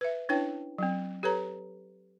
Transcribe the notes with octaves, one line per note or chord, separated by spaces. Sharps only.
B4 E5
C#4 D4 E4 B4 C#5 G5
F#3 C4
G4 A4 B4 C#5 A#5